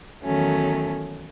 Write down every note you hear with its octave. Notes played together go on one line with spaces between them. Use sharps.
E2 D#3 F#3 A3 C#4